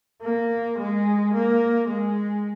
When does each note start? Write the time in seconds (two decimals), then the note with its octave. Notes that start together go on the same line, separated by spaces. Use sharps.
0.22 A#3
0.78 G#3
1.33 A#3
1.88 G#3